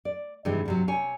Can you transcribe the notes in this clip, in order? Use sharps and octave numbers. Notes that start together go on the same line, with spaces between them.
D5
G2 C3 D#3 E3 G#3
G2 C3 F#3
C3 C#5 G#5